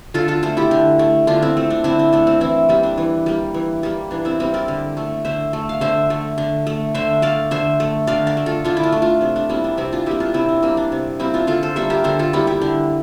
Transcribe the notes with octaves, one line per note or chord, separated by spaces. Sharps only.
D3 F4 A4
F4 A4
A3 A4 C5
E4 G4
D3
A3
D3 D4 F4
C4 E4
A3 C4
D4
D3 C4 E4
D4
A3 D4
C4
E3 C4 E4
G3 A#3
D4
E3
G3 A#3
E3
G3 A#3
E3 D4
C4 E4
G3 A#3 C4 E4
A#4 D5
D3
A3
D3 C5 E5
A3
F5
D3 C5 E5
A3
D3
A3
D3 C5 E5
A3 D5 F5
D3 C5 E5
A3
D3 D5 F5
A#4 D5
A3
F4 A4
D3 D4 F4
E4
D4 F4
A3
D4 F4
C3 D4
D4
G3 A#3 C4 E4
D4
C3 C4 E4
D4 F4
G3 A#3 E4 G4
D4 F4
C3 C4 E4
D4
G3 A#3 C4
D4
C3
G3 A#3 C4 E4
D4 F4
D3 F4 A4
A4 C5
G3 A#3 C5 E5
G4 A#4
D3 A4 C5
F4 A4
G3 A#3 E4 G4
E4 G4
D3